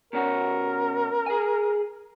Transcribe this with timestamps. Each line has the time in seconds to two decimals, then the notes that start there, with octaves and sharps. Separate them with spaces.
0.13 B2 C#4 F#4 A#4
1.26 G#4 G#5